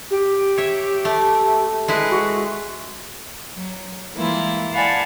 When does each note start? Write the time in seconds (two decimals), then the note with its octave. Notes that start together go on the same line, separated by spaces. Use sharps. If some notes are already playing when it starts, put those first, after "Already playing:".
0.10 G4
0.57 C#5 E5
1.05 A3
1.88 G#3 E4 B4
2.10 F#4
3.51 F#3
4.14 E3 G3 G#3 A#3 E4 F4
4.74 D5 F5 F#5 G#5 A5 B5